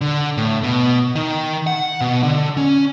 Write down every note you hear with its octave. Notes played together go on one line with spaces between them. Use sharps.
D3
A2
B2
D#3
F#5
B2
D3
C#4